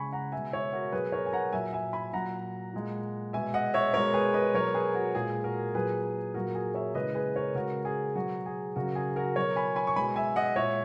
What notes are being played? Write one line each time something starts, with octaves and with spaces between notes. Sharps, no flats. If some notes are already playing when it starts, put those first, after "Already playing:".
Already playing: C#3 G#3 G#5 B5 C#6
F#5 A#5
B2 G#3 E5 G#5
C#5 E5
F#4 A#4
B2 F#3 G#4 B4
A#4 C#5
G#5
F#5 A#5
A#2 F#3 E5 G#5
E5 G#5
G#5 B5
A#2 F#3 F#5 A#5
A#2 G#3
B2 G#3 E5 G#5
D#5 F#5
C#5 E5
B2 G#3 A#4 C#5
G#4 B4
B4 D#5
B2 F#3 A#4 C#5
G#4 B4
F#4
A#2 G#3 G#4
F#4 A#4
A#2 F#3 G#4 B4
A#2 F#3 F#4 A#4
G#4
C#5 E5
C#3 E3 G#3 B4 D#5
G#4 B4
A#4 C#5
C#3 G#3 F#4 A#4
G#4
B2 F#3 F#4
G#4
C#3 F#3 F#4 A#4
G#4
F#4 A#4
B2 F#3 A#4 C#5
G#5 B5
G#5 B5
C#6
B2 G#3 G#5 B5
E5 G#5
D#5 F#5
A#2 G#3 C#5 E5